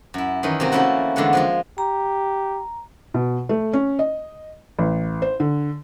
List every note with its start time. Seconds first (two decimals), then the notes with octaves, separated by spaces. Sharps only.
0.14 F#2 E4
0.43 D#3 E3 C#4 D#4
0.60 C3 F#3 A#3 C4
0.72 F3 A3 A#3 C#4 E4 F#4
1.16 E2 D3 E3 G#3 F#5
1.33 F3 G#3 F4
1.78 G4 A#5
3.14 B2
3.49 A3
3.73 C#4
3.99 D#5
4.79 A1
5.22 C5
5.40 D3